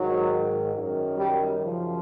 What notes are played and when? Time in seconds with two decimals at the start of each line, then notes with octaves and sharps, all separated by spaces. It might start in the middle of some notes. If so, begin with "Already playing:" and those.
Already playing: G#2 D#3 F#3
0.76 F#2 D#3
1.18 G3
1.59 F#2 C#3 F3